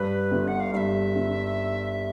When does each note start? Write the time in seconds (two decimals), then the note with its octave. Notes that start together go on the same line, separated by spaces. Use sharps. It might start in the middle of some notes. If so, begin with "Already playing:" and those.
Already playing: G2 B4
0.32 G1
0.47 F#5
0.60 F5
0.73 G2 E5 F5
1.16 G1